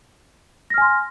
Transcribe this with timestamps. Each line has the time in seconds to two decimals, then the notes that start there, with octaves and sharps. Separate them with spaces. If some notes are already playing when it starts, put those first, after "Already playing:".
0.70 A#6
0.74 F6
0.78 G#5
0.81 C6